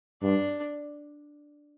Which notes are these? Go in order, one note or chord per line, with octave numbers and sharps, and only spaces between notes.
G2 D4